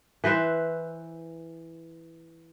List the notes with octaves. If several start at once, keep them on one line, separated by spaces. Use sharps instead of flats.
E3 B4 C5 E5